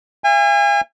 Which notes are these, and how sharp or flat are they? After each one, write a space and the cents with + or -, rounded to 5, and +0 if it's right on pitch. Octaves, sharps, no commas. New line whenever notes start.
E5 +45 G#5 -35